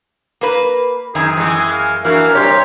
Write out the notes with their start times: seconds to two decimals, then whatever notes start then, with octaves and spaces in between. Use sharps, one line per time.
0.41 A#3 B4
1.15 F#2 D#3 G#4
1.37 E3 G#3
1.72 F5
2.04 E3 A#3 D4 F#4 A#4 E5 F5
2.35 G2 C3 G4 C#5 A#5 C6 G6